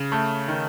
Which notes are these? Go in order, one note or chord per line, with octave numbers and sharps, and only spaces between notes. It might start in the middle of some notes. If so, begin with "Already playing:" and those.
Already playing: C#3
A3
D#3